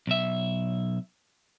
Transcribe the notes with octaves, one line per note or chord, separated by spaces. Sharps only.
B1 E5